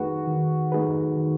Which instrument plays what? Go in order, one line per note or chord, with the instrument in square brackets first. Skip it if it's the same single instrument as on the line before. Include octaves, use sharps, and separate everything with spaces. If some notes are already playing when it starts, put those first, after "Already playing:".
Already playing: [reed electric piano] D#3 A3 D#4 G#4 B4 [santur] F#4
[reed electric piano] D#3
A3 D#4 G#4 B4
D#3